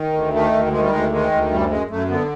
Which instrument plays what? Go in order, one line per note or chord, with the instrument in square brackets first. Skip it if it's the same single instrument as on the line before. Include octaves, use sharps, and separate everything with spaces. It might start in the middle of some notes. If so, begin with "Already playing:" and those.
Already playing: [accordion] D#3
D2
D#3 A3
D2
D#3 G#3
G3
D2 G#3
D#3 G#3
D2
F#2 G3
F#2 G#3
F#2 A3
D3 B3